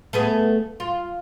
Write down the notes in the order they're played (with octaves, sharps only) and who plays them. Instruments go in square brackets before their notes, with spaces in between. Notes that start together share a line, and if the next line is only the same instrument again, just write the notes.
[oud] A3 B3 G#4
F4